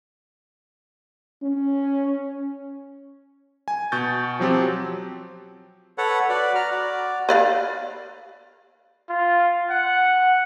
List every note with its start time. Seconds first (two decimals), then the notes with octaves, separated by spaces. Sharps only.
1.42 C#4
3.68 G#5
3.92 B2 C#6 G6 A6
4.40 F3 F#3 C4 G4
5.98 A4 B4 C#5 F#5
6.29 F#4 B4 D5
6.55 A#5 F6
6.71 F#4 D5
7.29 B4 D5 F5
9.09 F4
9.70 F#5